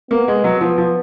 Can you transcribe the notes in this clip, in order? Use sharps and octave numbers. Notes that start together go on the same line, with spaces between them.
A#3 B3
G#3
F#3
F3 B3
F3